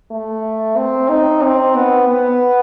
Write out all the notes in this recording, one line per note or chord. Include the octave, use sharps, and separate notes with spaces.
A3
C4
D#4
C4
B3
B3